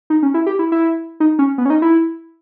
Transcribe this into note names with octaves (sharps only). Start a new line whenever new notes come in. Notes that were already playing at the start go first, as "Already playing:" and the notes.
D#4
C#4
E4
G4
E4
E4
D#4
C#4
B3
C#4
D#4
E4